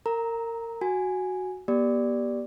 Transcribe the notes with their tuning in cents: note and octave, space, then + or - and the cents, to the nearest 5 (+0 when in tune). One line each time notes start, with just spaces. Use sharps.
A#4 -25 A#5 +0
F#4 +0 G#5 +0
B3 -45 G4 +0 D5 +0